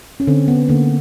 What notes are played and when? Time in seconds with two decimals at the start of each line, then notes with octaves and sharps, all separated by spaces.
0.20 C#4
0.27 D3 C4
0.48 B3
0.68 D3 A#3